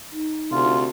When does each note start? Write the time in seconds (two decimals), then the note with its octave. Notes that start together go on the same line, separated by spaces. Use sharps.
0.12 D#4
0.51 D2 C3 F4